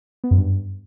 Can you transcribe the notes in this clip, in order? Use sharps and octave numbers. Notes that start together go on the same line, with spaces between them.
B3
F#2
G2